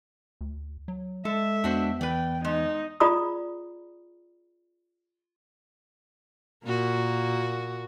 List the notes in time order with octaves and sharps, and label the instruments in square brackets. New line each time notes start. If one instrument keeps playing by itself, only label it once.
[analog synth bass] D2
F#3
[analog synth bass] G#3 [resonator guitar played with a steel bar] A4 [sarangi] E5
[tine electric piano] E2 B3 [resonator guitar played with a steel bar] D4 F#4 C5
[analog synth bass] E3 [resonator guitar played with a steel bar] B4 D5 [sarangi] G5
[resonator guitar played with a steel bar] G#3 [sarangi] D#4
[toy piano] F4 G#4 D5 A#5 B5 D#6
[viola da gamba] A#2 A#3 F#4